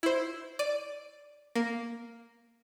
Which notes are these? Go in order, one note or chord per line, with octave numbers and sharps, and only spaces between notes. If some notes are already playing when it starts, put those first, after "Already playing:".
E4 C5
D5 D#7
A#3